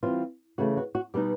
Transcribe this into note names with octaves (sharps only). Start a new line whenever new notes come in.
E3 G3 C4 F4
C#3 E3 A3 F#4
F#4
F#4
B2 G3 B3 D#4 G4